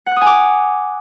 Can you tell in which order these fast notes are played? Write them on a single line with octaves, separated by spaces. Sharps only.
F#5 F#6 D#6 G#5 D6